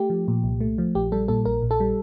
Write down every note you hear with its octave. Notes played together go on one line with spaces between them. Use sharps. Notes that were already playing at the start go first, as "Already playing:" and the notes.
Already playing: A3 G4
F3
A#2
C2
A3
F3
A#1 G4
G3 A4
A#2 A4
A#1 A#4
A#1
A4
G3